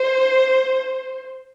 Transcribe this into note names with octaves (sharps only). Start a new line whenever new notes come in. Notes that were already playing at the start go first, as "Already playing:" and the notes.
Already playing: C5